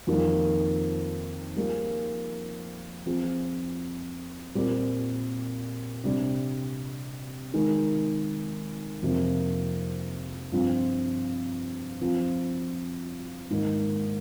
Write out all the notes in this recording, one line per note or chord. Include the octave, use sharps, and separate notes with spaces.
F2 D#3 G3 A#3 F4
G3 A#3 F4 G#4
F3 C4 F4 G#4
A#2 G3 C4 G4 A#4
C3 G3 D4
D#3 G#3 D#4 A#4
F2 C3 F3 A#3
G2 F3 C4 F4
F3 C4 F4
G#2 D#3 A#3 D#4